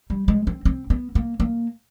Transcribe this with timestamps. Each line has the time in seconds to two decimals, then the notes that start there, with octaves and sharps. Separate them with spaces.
0.10 G3
0.28 G#3
0.47 C4
0.65 C4
0.90 B3
1.15 A#3
1.40 A#3